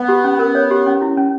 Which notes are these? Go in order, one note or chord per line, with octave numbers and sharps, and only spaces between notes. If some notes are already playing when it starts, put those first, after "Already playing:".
Already playing: B3
G4
C#4
A#4
C#5
G4
C#4
E4
C#4